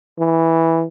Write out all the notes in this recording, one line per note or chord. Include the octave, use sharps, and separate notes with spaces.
E3